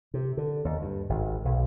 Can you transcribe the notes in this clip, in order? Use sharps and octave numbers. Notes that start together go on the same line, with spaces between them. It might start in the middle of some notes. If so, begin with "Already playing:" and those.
C3
D3
D#2
G2
G#1
B1